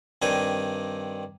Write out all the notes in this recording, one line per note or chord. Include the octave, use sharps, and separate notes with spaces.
G2 D#3 C4 D4 G5 G#5